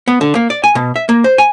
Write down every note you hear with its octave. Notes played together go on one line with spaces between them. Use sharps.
B3
D3
A#3
D5
G#5
B2
E5
A#3
C5
G#5